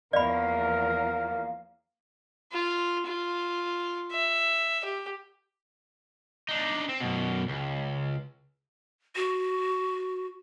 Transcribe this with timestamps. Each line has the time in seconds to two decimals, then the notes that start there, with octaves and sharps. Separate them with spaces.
0.13 E2 F3 A#3 A#4 D5 F5 B5
2.52 F4
3.06 F4
4.12 E5
4.85 G4
6.49 D4 D#4
6.89 C4
7.00 F#2 B2
7.49 C#2
9.16 F#4